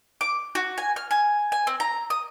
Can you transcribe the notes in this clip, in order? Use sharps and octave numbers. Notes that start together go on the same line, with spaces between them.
D6
F#4
G#5
F6
G#5
G#5
C4
A#5
D#6